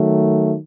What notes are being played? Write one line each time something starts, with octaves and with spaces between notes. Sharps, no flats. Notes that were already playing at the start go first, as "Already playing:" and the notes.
Already playing: D#3 F#3 A3